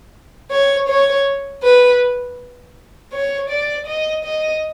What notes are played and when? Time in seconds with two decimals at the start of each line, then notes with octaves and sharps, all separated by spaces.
0.51 C#5
0.88 C#5
1.63 B4
3.12 C#5
3.50 D5
3.87 D#5
4.25 D#5